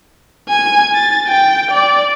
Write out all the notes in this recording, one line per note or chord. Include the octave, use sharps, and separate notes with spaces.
G#5
A6
G5
D5